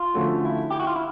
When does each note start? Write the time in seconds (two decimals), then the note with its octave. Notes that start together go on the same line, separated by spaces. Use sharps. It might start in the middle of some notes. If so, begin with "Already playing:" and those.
Already playing: F4
0.14 D3 F3 A3 C#4 F#4
0.44 E4
0.71 G4
0.80 F#4
0.87 F4
0.96 E4